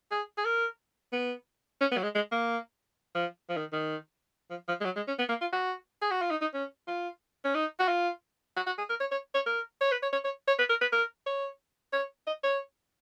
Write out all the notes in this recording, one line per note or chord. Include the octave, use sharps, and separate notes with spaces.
G#4
G#4
A#4
B3
C#4
B3
F#3
G#3
G#3
A#3
F3
F3
D#3
D#3
F3
F3
G#3
F#3
G#3
C#4
B3
A#3
F4
F#4
G#4
F#4
F4
D#4
D#4
C#4
F4
C#4
D#4
F#4
F4
F#4
F#4
G#4
A#4
C#5
C#5
C#5
A#4
C#5
B4
C#5
C#5
C#5
C#5
B4
A#4
B4
A#4
C#5
C#5
D#5
C#5